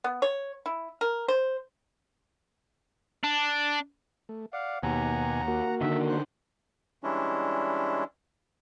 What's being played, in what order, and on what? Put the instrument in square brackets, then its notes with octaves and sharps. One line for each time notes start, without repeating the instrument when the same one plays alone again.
[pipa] B3
C#5
E4
A#4
C5
[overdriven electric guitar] D4
[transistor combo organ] A3
[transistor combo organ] D5 [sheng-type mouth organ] F5 F#5
[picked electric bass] D#2 [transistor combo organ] B2 G#5 [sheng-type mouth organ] F#5 A#5
[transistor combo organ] A#3 F#4
[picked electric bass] D3 D#3 [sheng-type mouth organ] E5
[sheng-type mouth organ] C5 F#6
[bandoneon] E3 G3 G#3 C#4 D4 E4